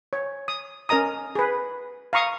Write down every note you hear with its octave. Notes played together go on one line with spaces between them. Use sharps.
C#5
D#6
C#4 A#4 D#5 A#5 D#6
G#4 B4
F5 A#5 C#6 D#6